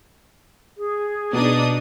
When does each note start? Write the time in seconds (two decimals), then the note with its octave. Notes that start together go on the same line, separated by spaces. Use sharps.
0.77 G#4
1.33 B2 D4 D#4 D#6